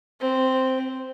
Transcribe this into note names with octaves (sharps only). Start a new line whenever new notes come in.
C4